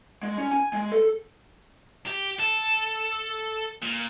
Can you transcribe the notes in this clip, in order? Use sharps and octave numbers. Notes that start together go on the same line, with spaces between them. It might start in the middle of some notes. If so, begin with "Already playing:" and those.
G#3
C#4
G#5
G#3
A4
G4
A4
A#2